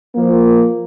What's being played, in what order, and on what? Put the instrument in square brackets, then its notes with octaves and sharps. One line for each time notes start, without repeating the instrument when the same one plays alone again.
[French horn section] F3 A#3